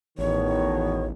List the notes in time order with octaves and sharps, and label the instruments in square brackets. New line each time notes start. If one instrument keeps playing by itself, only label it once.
[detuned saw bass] A1 [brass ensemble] E2 B2 D#3 [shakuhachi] C#5